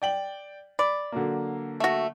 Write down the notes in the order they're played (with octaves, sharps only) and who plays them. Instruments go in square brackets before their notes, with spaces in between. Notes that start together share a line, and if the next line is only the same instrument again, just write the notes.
[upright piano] D5 G5 F#7
[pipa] D5 [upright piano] B5
[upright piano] D3 F#3 A#3
[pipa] A3 F#4